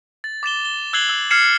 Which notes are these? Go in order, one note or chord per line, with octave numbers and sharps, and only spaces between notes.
A6
D6 A6 E7 G7
G7
E6 F#6 G#6 C7 F#7 G7
E6
F6 G#6 C7 C#7 E7